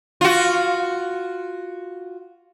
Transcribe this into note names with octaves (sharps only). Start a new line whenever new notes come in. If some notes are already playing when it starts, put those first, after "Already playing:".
F4 F#4